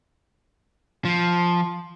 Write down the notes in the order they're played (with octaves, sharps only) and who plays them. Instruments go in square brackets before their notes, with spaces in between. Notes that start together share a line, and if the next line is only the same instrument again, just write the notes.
[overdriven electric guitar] F3